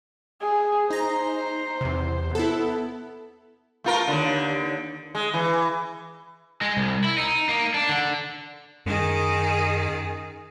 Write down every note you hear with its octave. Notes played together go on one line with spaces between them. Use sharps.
G#4
D#4 C5 A#5
E2 C3
B3 E4 A4
A3 F4 A#4
D#2 D3
G#3
E3
G#3
C2
E4
D#4
A#3
D4
D3
F#2 D#3 G#4